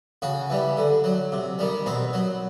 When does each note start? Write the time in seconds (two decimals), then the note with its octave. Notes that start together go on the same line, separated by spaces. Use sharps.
0.22 C#3 F#4
0.50 E3 G3
0.77 D3
1.04 F#3
1.32 C3
1.59 D#3 G3
1.86 B2 C4
2.13 F#3